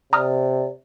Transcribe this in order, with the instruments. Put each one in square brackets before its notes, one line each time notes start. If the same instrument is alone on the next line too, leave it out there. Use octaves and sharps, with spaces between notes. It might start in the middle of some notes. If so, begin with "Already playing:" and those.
[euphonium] C3 [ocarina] D5 [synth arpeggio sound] A#5 D#6 F6